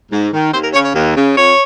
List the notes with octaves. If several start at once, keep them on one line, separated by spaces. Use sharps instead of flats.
G#2
D#3
D#2 C5
A#4
C#3 C#5
C#5
D#2
C#3
F2 C#5